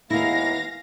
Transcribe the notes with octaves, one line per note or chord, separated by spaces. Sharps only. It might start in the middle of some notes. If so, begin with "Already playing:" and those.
D#2 G#3 A#3 B3 E4 F5 A#6